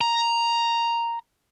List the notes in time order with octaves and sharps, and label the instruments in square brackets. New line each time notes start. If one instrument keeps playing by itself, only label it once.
[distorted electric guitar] A#5